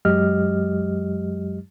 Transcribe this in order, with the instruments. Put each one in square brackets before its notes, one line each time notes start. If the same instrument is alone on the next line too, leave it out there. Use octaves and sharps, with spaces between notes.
[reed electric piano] F#2 F#3 G#3 G4 D#5 F6